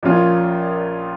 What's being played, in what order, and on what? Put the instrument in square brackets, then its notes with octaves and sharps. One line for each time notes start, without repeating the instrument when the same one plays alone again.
[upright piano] A#1 A#2 F3 C#4 F4